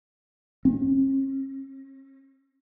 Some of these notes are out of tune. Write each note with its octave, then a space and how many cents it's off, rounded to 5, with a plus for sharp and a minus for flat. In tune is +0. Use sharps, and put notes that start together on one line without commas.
C#4 -45